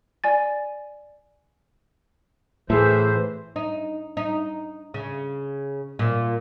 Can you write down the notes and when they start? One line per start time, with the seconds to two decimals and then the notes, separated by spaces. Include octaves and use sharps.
0.24 D5 G#5 A6
2.70 A2 E3 G#4 C5 E5 F#5 A5
3.56 D#4
4.17 D#4
4.94 C#3
5.99 A#2